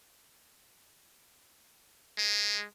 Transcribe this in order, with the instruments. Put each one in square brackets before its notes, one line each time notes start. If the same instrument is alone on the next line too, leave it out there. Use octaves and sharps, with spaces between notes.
[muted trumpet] G#3